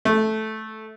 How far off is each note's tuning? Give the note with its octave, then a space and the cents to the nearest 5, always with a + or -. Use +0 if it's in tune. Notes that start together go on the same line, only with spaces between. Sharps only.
A3 -10